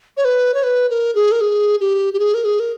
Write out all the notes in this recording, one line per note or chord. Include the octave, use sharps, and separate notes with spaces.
C#5
B4
C#5
B4
A#4
G#4
A#4
G#4
G4
G4
G#4
A#4
G#4
A#4